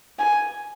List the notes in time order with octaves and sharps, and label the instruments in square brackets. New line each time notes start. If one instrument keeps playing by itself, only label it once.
[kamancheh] G#5